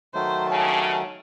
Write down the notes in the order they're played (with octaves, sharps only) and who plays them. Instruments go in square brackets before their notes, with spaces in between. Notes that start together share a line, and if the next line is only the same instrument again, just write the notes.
[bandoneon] D#3 F#3 A3 [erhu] C5
[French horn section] G2 C#3 [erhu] A5